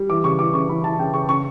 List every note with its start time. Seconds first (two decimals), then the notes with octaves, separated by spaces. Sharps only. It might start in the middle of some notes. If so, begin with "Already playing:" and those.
Already playing: G3
0.09 E3 D6
0.24 C#3 C#6
0.39 E3 D6
0.54 C#3 C#6
0.69 E3 B5
0.84 E3 A5
0.99 C#3 G5
1.14 C#3 C#6
1.29 C#3 C#6